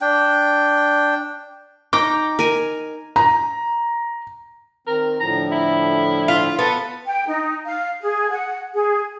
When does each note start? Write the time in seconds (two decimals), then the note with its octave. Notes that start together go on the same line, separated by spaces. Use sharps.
0.01 D4 G5
1.93 D#4 G5 A#5 D6
2.39 A#4 G#5
3.16 A#5
4.87 D#3 C4 A#4
5.20 A2 D3 F3 A#5
5.52 E4
6.28 F4
6.59 B3 A4
7.06 G5
7.27 D#4
7.65 F5
8.00 G#4
8.31 F#5
8.73 G#4